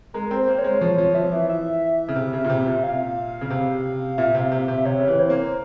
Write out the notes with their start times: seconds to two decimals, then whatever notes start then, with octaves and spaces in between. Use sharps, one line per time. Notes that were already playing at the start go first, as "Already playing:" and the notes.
0.14 G#3 A#4
0.25 A#4
0.31 C4
0.37 C5
0.48 A#3
0.59 C#5
0.64 G#3
0.81 F3 C#5
0.98 F3
1.15 F3 E5
1.32 E3
1.49 E5
2.09 C#3
2.16 C3
2.33 C#3
2.44 A#2
2.50 C3
2.66 A#2
2.83 F5
3.41 C#3
3.50 C3
4.18 A#2 E5
4.35 C3
4.41 F5
4.52 C3
4.63 E5
4.68 C3
4.85 C3 C#5
5.00 C#3
5.08 E3
5.19 C5
5.30 A#3